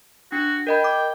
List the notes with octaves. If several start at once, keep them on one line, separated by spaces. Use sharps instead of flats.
D4 F#4
A#4 D#5 G5 B5
D6